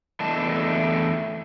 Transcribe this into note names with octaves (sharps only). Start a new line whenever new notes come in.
E2 A3 D4 E4 D#5 A5